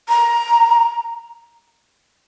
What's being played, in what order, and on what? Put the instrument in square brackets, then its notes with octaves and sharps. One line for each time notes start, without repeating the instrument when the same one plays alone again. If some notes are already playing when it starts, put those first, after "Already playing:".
[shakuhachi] A#5